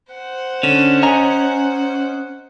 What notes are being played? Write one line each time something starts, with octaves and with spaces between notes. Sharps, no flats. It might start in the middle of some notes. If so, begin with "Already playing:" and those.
C5 F#5
D3 C#4
D#5 G#5 A#5